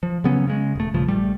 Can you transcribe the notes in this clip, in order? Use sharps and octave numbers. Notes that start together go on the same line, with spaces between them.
F3
C#3 F#3 B3 C#4
C#3 G#3
E1 A3
A#1 G2 C#3 F3
A#1 G3 A3